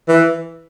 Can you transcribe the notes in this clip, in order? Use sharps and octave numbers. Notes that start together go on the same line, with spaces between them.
E3